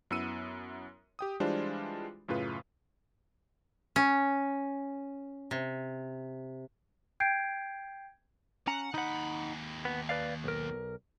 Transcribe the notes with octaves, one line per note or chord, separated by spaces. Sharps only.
F#2 B3 E4 E6 C#7 D#7
G4 G5 D#6
E3 G3 G#3 D4 F4 C5
F#2 A2 C#3 F4 B4
C#4
C3
G5 G6 G#6 C7 D7
C#4 F#5 A#5
D#2 D#4 F#5 B5
B3
B4 D5 F5
B1 A#4